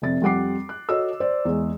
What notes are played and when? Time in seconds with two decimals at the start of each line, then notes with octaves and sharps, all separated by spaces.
0.02 F1 C3 A6
0.22 F2 G3 F#5 D6 C7
0.69 F#6
0.89 F#4 A4 C#5 D#5 E6
1.20 C5 D5
1.45 E2 G#3